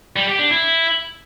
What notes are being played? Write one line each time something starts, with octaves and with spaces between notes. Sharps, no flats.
G3
G4
D4
E4